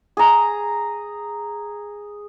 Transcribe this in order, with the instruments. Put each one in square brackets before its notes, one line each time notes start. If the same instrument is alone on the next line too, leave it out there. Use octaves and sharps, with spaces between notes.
[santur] G#4 A#5